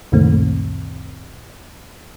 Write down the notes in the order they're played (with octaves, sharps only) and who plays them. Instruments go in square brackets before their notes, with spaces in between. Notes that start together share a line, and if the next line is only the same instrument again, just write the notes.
[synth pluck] C#2 F#2 A#2 D#3 A3 C4